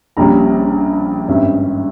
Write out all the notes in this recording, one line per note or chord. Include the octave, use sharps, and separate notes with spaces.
A#1 A#2 G3 C#4 A#5
G#1 G2 G3 C#4 E5